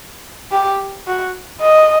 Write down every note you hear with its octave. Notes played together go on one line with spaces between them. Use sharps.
G4
F#4
D#5